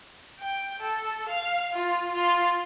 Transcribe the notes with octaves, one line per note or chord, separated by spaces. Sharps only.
G5
A4
F5
F4
F4